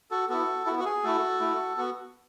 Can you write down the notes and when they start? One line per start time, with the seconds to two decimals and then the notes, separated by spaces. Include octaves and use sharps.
0.11 F#4 A4
0.29 B3 E4 F#4 A4
0.66 E4 F#4
0.71 B3
0.79 F#4
0.85 G#4
1.03 A3 E4 F#4 A4
1.40 A3 E4
1.77 B3 F#4